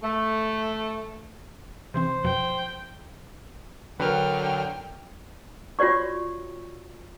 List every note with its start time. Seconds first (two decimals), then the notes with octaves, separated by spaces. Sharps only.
0.03 A3
1.94 C3 E3 C4 C5
2.25 F2 B2 F3 G5
4.00 D3 F#3 A#4 B4 G5 F6
5.79 F4 F#4 C#5 D5 C#6